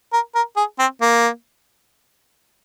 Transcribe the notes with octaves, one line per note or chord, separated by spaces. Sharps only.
A#4
A#4
G#4
C4
A#3